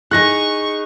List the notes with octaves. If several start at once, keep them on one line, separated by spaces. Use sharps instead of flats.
D#4 G#4 C#6 F#6 A#6